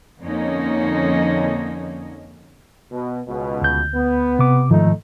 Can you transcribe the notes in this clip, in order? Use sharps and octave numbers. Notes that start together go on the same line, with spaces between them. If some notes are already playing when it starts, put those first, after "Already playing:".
F2 D3 A#3 C#4 D#4
B2
C#2 B2
D2 G6
B3
C3 D6
G#2 D#3 F3 A3 D#4